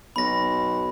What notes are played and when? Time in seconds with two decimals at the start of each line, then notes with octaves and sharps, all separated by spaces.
0.16 B1 B5 A#6